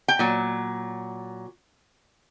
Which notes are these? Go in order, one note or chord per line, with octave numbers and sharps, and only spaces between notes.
G5
A#2 F#3